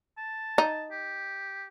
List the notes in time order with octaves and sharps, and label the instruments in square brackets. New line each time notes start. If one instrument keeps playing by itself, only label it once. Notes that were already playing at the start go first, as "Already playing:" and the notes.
[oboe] A5
[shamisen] D#4
[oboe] G4